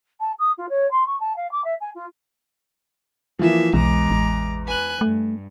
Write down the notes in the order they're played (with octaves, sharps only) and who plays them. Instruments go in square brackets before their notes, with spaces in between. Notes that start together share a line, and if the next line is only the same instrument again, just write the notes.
[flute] A5
D#6
F4
C#5
C6
C#6
A5
F5
D6
E5
G#5
F4
[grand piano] E3 F3 [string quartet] A#3 E5
[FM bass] B1 [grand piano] E2 [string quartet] G#3 A#5 D6
[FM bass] A1
[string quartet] B4 G#5 F#6
[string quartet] G2 [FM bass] A3